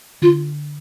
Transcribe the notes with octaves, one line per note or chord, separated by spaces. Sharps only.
D3 F4